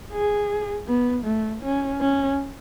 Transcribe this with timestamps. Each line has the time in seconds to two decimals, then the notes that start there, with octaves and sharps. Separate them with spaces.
0.13 G#4
0.88 B3
1.25 A3
1.63 C#4
2.01 C#4